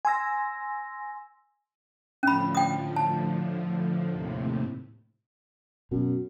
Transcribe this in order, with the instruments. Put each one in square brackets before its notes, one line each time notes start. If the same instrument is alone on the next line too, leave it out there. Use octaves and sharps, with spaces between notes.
[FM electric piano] G#5 C6 E6 A#6
[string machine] A2 D3 F3 [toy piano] C#4 B5
[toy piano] G5 D#6
A5
[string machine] D#2 A2 C3
[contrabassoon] F#2 [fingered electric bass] B2